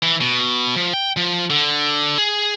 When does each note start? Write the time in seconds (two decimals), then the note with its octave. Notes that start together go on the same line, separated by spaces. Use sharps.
0.03 E3
0.21 B2
0.76 F3
0.93 G5
1.17 F3
1.50 D3
2.18 G#4